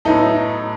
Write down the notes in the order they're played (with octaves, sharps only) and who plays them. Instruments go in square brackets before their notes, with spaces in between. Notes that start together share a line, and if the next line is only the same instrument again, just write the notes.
[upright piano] A2 F#3 B3 E4 A4 [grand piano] D#4